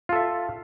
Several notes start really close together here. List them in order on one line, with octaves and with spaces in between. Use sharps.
F4 A4 E5